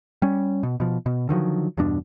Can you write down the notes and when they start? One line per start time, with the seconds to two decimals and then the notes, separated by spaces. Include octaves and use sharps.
0.22 G3 C#4
0.63 B2
0.80 B2 F3
1.06 B2
1.29 D3 D#3 F3 F#3
1.77 E2 G2 B2 D4